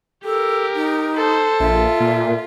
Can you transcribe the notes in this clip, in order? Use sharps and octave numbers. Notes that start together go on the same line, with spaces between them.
G4 A4 A#4
D#4
A4 C5
A#1 F4 E5
A#2